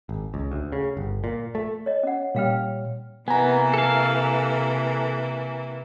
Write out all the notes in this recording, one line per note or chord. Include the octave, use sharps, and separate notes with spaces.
G#1
C#2
D2
C#3
G1
A#2
A3
C#5 D#5
C#4 F#5
A#2 G3 C#5 F5 G5 F6
C3 E3 A#3 B3 G#5 A#5
A4 F5